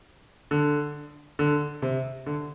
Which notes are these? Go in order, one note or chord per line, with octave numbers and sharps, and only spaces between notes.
D3
D3
C3
D3